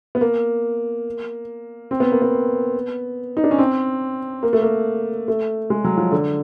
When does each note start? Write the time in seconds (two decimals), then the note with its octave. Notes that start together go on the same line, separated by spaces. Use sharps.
0.15 B3
0.21 A#3
1.91 C4
2.00 B3
2.12 A#3
2.22 B3
3.37 D#4
3.44 D4
3.51 C#4
3.58 C4
4.43 A#3
4.53 A3
4.62 A#3
5.28 A3
5.70 G#3
5.84 F#3
5.97 F3
6.12 D3